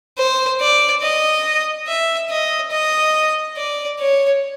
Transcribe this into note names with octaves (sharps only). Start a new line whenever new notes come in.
C5
D5
D#5
E5
D#5
D#5
D5
C#5